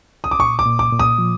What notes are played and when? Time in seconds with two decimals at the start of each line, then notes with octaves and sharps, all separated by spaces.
0.24 D#6
0.31 D6
0.39 A#2 C#6
0.59 D6
0.66 A#2
0.79 D6
0.92 A#2
0.99 D#6
1.19 F3